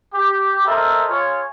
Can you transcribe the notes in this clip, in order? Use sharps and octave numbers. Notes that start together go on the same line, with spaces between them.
G4
A4 A#4 C5 D#5 E5 A5
F4 G#4 C#5